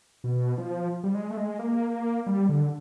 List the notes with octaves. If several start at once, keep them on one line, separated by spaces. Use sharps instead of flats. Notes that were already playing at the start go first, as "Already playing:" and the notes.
B2
F3
G3
G#3
A3
G#3
A#3
G3
D3